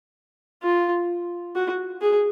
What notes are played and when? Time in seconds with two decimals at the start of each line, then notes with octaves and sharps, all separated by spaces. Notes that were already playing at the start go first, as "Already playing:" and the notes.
0.63 F4
1.56 F#4
2.01 G#4